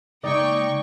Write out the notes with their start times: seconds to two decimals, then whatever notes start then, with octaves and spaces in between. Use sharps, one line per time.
0.23 C#3 G#3 A#3 D#4 D5 G5 C#6